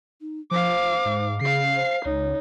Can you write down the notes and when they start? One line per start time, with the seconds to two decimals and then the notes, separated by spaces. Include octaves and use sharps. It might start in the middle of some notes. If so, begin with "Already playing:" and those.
0.21 D#4
0.51 F3 C5 F5 D6
1.05 G#2
1.41 C#3 G#4 F5 C7
1.76 C5
2.05 C#2 D#4 C#5